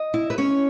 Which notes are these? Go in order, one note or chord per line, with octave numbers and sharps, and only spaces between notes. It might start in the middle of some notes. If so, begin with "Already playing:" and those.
Already playing: D#5
E4
B4
C#4 C#5